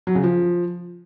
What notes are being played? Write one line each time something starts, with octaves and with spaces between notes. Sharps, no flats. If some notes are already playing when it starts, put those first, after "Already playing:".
F#3
C#3
F3